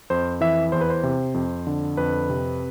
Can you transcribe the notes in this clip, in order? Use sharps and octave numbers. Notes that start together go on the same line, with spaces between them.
F2 C5
E3 E5
E2 C5
B4
C5
C3
F2
D3
F2 B4
C3